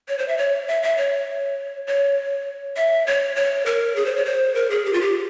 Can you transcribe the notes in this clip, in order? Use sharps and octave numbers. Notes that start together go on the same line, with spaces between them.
C#5
C5
E5
C#5
E5
E5
C#5
C#5
E5
C#5
C#5
A#4
G#4
C5
C#5
C5
A#4
G#4
G4
F4
G4